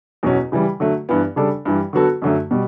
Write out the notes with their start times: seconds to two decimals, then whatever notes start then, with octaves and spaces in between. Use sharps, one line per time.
0.23 E2 B2 F#3 C#4
0.52 C#3 E3 G3
0.80 D3 F#3 A3
1.09 G2 E3 B3
1.36 C#3 G3 D4 A4 D5
1.65 G2 E3 G3
1.93 D3 F#3 B3 F#4 A4
2.22 F#2 D3 F#3 A3
2.51 B2 G3